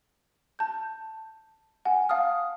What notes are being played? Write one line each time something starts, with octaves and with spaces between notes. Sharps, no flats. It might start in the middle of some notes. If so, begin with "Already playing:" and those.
A5 G6
F#5 G#5
F5 F#5 A5 D#6 F6